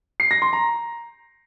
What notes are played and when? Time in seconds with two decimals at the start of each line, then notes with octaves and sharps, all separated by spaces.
0.20 C7
0.31 A#6
0.42 C6
0.53 A#5